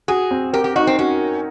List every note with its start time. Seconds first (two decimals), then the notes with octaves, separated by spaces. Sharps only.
0.08 F#4 G#4
0.31 C4
0.53 G4 A#4
0.64 G4
0.76 D#4 F#4
0.87 C4
0.99 C#4 F#4